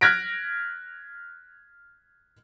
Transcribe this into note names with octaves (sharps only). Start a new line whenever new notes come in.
F6 F#6 G#6 A#6 B6 D7